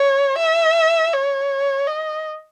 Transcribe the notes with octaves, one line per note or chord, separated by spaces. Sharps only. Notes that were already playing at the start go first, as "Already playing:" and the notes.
Already playing: C#5
E5
C#5
D#5